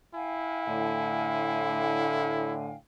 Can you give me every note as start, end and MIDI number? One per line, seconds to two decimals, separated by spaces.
0.15 2.56 64
0.15 2.74 77
0.15 2.74 79
0.15 2.74 80
0.68 2.74 45
0.68 2.74 50